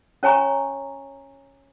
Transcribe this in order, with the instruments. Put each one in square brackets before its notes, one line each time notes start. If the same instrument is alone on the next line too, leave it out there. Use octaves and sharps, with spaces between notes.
[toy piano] C#4 C#5 G#5 A#5 C#6